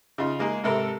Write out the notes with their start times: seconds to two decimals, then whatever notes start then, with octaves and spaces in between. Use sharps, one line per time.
0.18 C#3 D#4 F4
0.39 G#3 A#3 D#4 G#4
0.63 G#2 C3 A4 A#4 B5